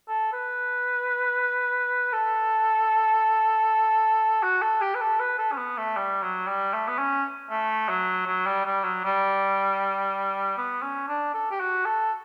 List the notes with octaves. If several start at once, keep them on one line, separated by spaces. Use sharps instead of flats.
A4
B4
A4
F#4
A4
G4
B4
A4
B4
A4
C#4
B3
A3
G3
F#3
G3
A3
B3
C#4
A3
F#3
F#3
G3
G3
F#3
G3
B3
C#4
D4
A4
G4
F#4
A4